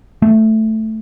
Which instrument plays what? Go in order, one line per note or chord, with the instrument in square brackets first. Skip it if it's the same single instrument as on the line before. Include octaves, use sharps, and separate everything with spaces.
[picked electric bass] A3